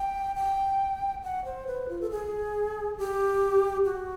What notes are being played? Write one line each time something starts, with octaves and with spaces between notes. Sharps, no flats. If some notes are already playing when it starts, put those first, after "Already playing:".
Already playing: G5
G5
F#5
C5
B4
F4
A4
G#4
G4
F#4